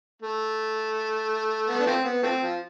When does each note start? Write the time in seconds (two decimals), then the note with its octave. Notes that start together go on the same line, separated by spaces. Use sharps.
0.22 A3
1.68 B3
1.80 D4
1.86 F3 A3 C4
2.05 B3
2.23 F3 A3 C4
2.42 F3